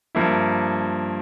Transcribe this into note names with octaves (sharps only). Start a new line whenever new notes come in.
G2 F3 A#3 E4